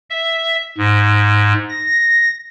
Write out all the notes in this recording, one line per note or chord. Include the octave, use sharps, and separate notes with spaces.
E5
G#2
A#6